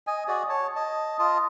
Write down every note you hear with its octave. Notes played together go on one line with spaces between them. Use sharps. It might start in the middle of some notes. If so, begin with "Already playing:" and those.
D#5 G#5
F#4 G#4 D5 D#5
C#5 A5
D#5 A5
F4 D#5 A5